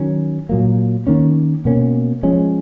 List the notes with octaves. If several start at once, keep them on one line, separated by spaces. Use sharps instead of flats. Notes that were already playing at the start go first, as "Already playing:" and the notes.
Already playing: D#3 F#3 C#4
A#2 F#3 A#3
D#3 A#3 C#4
B2 A#3 C#4
F3 G#3 C#4